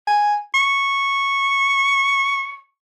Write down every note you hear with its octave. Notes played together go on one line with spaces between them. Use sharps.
G#5
C#6